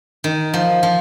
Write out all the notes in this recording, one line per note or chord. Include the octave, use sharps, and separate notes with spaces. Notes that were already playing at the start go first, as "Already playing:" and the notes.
D#3
F3
F3